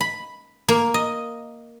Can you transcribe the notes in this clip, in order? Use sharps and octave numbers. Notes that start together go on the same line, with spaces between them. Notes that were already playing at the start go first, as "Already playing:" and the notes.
B5
A#3
D#5